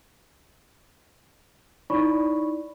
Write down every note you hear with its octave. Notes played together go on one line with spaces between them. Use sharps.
D#4 E4 C#5 D5 B5 C#6